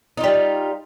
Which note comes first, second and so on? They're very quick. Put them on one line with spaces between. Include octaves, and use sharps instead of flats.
D#4 F4 G3